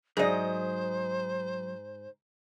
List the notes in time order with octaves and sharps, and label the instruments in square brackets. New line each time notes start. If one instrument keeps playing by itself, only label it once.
[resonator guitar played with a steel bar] G#2 D#5 [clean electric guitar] F#3 [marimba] G#4 D5 [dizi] C5